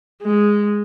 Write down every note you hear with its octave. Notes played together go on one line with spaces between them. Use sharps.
G#3